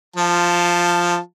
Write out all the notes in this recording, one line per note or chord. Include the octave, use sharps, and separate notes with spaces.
F3 F4 A5